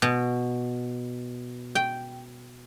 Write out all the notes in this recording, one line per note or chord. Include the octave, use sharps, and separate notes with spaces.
B2
G5